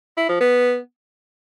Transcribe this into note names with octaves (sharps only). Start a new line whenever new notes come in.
E4
F3
B3